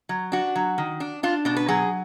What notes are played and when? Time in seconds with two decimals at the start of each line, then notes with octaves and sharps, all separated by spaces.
0.09 F#3
0.32 D4 F#4
0.55 F#3
0.78 D#3
1.00 D4
1.23 D4 F4
1.45 B2 D4
1.56 B4
1.68 F#3 G#4